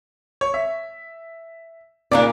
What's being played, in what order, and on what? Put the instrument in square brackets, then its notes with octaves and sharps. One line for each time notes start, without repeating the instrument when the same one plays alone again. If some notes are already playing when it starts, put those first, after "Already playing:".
[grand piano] C#5
E5
[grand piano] A#2 C#3 A#3 [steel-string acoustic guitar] D4 D#4 D5